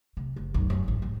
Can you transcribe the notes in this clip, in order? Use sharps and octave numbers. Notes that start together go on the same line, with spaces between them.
C3
F#1
B1 F#2
F#2 F#3
A1
G#3